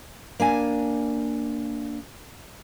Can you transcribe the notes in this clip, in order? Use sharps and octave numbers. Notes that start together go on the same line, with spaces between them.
A#3 D4 G#5